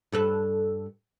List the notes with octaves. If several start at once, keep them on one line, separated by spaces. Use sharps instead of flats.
G2 A4 B4